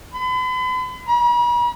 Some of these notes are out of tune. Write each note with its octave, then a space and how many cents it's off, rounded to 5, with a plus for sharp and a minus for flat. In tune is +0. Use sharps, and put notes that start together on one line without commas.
B5 +40
B5 -45